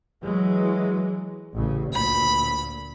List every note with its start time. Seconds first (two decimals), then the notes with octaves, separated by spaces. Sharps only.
0.21 E3 F#3 G#3
1.56 A1 C#3
1.93 D2 A#2 B5